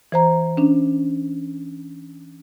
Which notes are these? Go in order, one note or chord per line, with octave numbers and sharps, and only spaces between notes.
E3 C5 A#5
C#4 D4